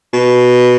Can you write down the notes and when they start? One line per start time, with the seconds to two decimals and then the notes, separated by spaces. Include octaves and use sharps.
0.13 B2